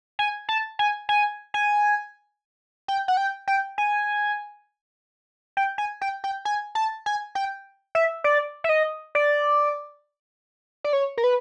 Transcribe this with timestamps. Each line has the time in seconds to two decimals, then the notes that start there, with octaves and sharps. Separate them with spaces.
0.19 G#5
0.49 A5
0.79 G#5
1.09 G#5
1.54 G#5
2.88 G5
3.08 F#5
3.17 G5
3.48 G5
3.78 G#5
5.57 G5
5.78 G#5
6.01 G5
6.24 G5
6.45 G#5
6.75 A5
7.06 G#5
7.35 G5
7.95 E5
8.24 D5
8.64 E5
8.69 D#5
9.15 D5
10.84 D5
10.93 C#5
11.18 A#4
11.24 B4